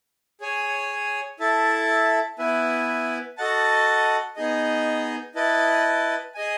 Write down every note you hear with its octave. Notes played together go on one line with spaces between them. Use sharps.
G#4 C#5 G#5
E4 A4 E5 A5
B3 E4 B4 E5 G#5
F#4 A4 D#5 F#5 A5
B3 D#4 G#4 D#5
E4 B4 D#5 A5
G#4 D#5 G#5